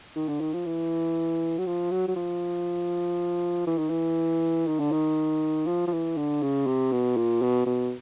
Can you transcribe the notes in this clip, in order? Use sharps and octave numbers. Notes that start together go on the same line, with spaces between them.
D#3
D3
D#3
F3
E3
F#3
F3
F#3
F#3
F3
E3
D#3
E3
D#3
D3
D#3
F3
F3
E3
D3
C#3
C3
B2
A#2
B2
B2